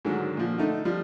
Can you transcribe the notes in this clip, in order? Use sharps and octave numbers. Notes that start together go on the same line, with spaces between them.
G#2 D3 D#3 F#3
A#2 F3
D3 A3 D#4
F3 G3